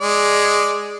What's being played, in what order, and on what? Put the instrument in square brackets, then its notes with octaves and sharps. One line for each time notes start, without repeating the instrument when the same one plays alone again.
[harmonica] G#3 D5